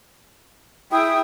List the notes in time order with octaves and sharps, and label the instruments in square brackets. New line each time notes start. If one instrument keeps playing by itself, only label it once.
[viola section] E4 G#4 E5 [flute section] G5 D#6